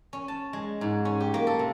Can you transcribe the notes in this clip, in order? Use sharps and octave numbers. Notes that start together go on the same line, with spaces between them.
C#4
A5
G#3
G#2
C#4
G4
A#3
A4
C3